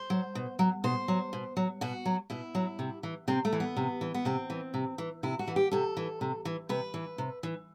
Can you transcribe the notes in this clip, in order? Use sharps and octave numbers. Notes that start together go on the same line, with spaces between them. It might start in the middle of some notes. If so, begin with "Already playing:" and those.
Already playing: C5
F#3
B2
F#3
B2 C5
F#3
B2
F#3
B2 F#4
F#3
B2 E4
F#3
C3
E3
C3 C4
A3
E3
B3
C3
E3
B3
C3 C4
E3
C3
E3
C3 E4
F#4
E3
G4
C3 A4
E3
C3
E3
C3 B4
E3
C3
E3